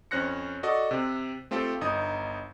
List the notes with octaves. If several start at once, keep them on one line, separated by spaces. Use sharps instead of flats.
F2 C#4 C5 F#6 A#6 C#7
F#4 A4 D5 D#5
C3 C4
A3 C4 F4 G4 A4
G1 D#4 D#6